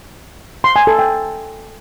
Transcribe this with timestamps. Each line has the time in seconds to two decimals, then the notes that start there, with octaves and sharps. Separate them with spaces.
0.64 C6
0.76 G#5
0.87 A4
0.99 G5